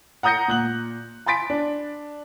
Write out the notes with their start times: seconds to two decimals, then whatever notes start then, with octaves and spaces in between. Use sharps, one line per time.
0.23 F#5 A#5 D#6 G6 A#6 C#7
0.48 A#2 F#6 F#7
1.26 G#5 B5 C6 A6 B6 D7
1.50 D4